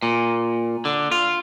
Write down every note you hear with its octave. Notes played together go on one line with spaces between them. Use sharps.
A#2
D3
F4